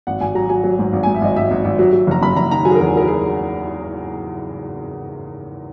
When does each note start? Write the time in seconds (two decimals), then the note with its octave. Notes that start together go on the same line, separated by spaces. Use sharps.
0.07 G#1 F#5
0.21 G#1 G#5
0.35 F#3 A#5
0.49 F#3 G#5
0.64 F#3
0.79 G#2
0.93 G#1
1.03 G#5
1.07 G#2
1.15 E5
1.22 G#1 D#5
1.36 G#1 E5
1.51 G#1
1.65 G#1
1.79 F#3
1.93 F#3
2.07 F#1 A#5
2.22 F#1 B5
2.36 F#1 A#5
2.51 D#3 A#5
2.65 F#3 G#5
2.71 G#4
2.75 A#4
2.80 E2
2.86 G#4
2.95 F#3 A#4
3.08 G#4